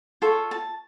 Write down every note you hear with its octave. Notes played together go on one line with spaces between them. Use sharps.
F4 A4 C#5
A5